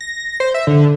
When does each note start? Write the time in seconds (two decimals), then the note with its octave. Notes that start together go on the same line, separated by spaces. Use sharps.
0.01 A#6
0.40 C5
0.54 E5
0.67 D3